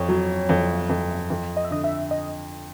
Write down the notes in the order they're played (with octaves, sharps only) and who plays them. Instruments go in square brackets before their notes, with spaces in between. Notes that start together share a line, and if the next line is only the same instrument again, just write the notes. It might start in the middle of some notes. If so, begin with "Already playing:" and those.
Already playing: [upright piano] F2 [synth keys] C#5
[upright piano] F#3
F2
F2
F2
[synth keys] D#5
E5
[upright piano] D3 [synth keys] D#5
[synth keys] E5
D#5